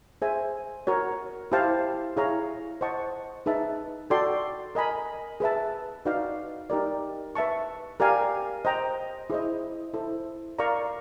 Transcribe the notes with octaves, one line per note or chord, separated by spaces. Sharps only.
G#4 C5 E5 G#5
F#4 A#4 C#5
E4 G4 C5 F5 A5
E4 G#4 C#5 F5 A#5
C5 D#5 F#5 A5 C#6
D#4 G#4 B4 E5 A5
F#4 A4 D5 G5 C6
A#4 D#5 G#5 B5
G#4 B4 E5 A5
D#4 F#4 B4 D5 F5
D#4 G4 A#4 D5
B4 E5 A5 C#6
G4 A#4 D5 F5 G#5
C5 D#5 G5 A#5
E4 G#4 C5 D#5
E4 A4 C5
A#4 D5 F5 A#5 C#6